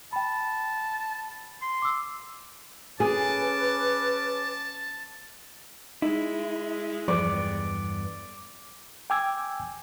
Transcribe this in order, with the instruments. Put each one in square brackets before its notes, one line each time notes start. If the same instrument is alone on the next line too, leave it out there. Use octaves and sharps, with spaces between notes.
[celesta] G5 B5 [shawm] A5
[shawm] C6
[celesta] D6 E6
[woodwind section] C#4 D6 [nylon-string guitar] G#4 [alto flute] B4 [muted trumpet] A5
[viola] G#3 [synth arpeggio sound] D#4 [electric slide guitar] E4
[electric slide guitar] E2 G2 B3 [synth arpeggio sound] F3 [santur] D5
[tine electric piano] G5 G#5 D6 E6 G#6